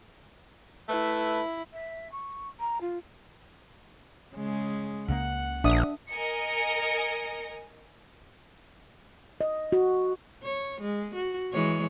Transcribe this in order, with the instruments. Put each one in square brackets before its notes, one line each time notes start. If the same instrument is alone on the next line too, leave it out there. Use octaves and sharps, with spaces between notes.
[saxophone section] A3 B4 [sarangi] E4
[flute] E5
C#6
A#5
F4
[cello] C#3 G#3
[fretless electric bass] C#2 C#3 A#3 [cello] F#5
[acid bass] A#1 [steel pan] D4 E5 D#6
[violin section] A#4 D#5 G#5 C#7
[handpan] D#5
F#4
[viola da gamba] C#5
G#3
F#4
E3 G#3 C#5